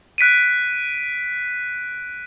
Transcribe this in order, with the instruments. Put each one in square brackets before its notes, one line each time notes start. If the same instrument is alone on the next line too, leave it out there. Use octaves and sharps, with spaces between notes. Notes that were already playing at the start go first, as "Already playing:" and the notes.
[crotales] F#6 B6 D7 D#7